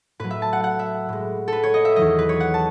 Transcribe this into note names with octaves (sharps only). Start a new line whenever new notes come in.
A2 F#3 B4
E5
A5
F#5
F#5
E5
A2 G#3
A4 B4
C#5
D#5
E5
E2 D#3 F#3 D#5
B4
C#5
F#5
A5